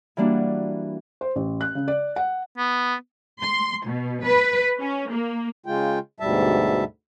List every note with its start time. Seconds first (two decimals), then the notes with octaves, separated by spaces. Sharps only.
0.17 E3 G3 A#3 D4 F#4
1.21 C5
1.36 A1
1.61 F#6
1.75 C#3
1.88 D5
2.16 F#5
2.58 B3
3.41 C6
3.86 B2
4.24 B4
4.81 C#4
5.11 A#3
5.66 C#3 G#3 F4 G5
6.20 D2 G#2 B2 G3 E5 A5